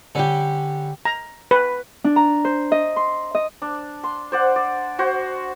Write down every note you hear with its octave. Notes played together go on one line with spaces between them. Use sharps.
D3 G3 C#4 G4
A#5
B4
D4
A#5
C5
D#5
C6
D#5
D4
C6
C5 D5 F#5
D5
F#4 C5